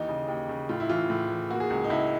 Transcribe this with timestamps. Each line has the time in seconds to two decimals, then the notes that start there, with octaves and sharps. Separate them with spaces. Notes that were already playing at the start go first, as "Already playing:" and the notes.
Already playing: D#2 E3 D#4
0.09 C#3
0.28 D#2
0.49 C#3
0.69 A2 F4
0.80 E4
0.89 E3 F4
1.10 A2
1.30 E3
1.50 A#3 F#4
1.60 G#4
1.70 C#2
1.84 D#4
1.90 C#2 E4